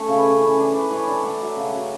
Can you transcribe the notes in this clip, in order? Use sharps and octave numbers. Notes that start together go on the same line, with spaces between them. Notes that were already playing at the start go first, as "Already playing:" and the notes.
Already playing: A3 C#4 A4
C#3 C#5
B4
C#3
E3
D4
E3
B4
E3 C#5
D4 D5
D4 F#5
F#3 E5
C#3
F#5
F#3